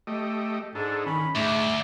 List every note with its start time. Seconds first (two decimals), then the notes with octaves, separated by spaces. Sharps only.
0.07 A3 G4 D#5
0.75 G#2 D4 D#4 G#4 A4
1.06 D#3 C#4 B5
1.35 D2 G#2 A3 D6